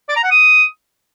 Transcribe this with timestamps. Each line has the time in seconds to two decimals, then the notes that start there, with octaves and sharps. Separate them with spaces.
0.09 D5
0.16 A#5
0.24 F#5
0.31 D#6